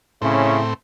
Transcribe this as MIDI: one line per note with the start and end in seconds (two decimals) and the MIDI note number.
0.22 0.74 45
0.22 0.61 49
0.22 0.74 60
0.22 0.61 61
0.22 0.61 64